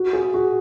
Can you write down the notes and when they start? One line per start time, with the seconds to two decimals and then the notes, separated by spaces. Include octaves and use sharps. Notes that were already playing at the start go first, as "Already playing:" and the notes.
Already playing: F#4
0.13 G#4
0.34 F#4